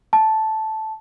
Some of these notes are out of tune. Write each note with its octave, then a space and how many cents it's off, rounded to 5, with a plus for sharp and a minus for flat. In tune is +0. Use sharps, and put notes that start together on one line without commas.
A5 -5